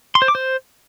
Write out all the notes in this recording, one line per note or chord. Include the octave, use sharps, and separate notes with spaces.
C6
C5
D6
C5